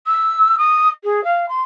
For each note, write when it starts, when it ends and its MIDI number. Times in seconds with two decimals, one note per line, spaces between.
0.07 0.56 88
0.58 0.89 87
1.04 1.23 68
1.24 1.46 77
1.49 1.63 84